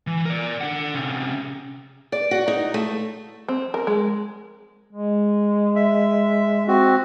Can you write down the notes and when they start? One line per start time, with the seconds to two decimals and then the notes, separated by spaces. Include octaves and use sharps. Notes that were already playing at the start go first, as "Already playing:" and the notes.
0.07 E3
0.25 A#4 D5
0.61 D4 F#5
0.94 C3 C#4
2.12 D5
2.31 F#4
2.48 D#4
2.74 A3
3.48 C4
3.74 A#4
3.87 G#3
4.93 G#3
5.76 E5
6.68 C4 F#4